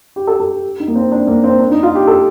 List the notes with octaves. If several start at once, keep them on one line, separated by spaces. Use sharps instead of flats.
G4
A4
A4
G4
D#4
A#3
C4
D4
A#3
C4
D4
D#4
F4
G4
A4